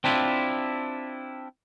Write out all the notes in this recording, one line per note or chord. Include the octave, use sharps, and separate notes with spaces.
C4 D4 E4 F4